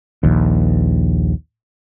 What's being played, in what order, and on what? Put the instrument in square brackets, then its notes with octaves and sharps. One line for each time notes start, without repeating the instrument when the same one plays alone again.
[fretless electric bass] A#1 D#2